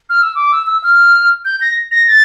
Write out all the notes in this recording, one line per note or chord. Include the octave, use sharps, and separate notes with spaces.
F6
E6
D6
E6
E6
F6
G6
A#6
A#6
A6